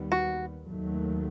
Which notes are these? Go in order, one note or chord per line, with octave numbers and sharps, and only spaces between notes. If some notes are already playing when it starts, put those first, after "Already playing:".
Already playing: D#2 D#3 G3 B3
F#4
D#2 D#3 F#3 A3